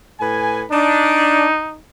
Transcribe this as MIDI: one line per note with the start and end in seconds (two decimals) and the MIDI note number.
0.21 0.63 45
0.21 0.63 71
0.21 0.63 80
0.72 1.45 62
0.72 1.77 63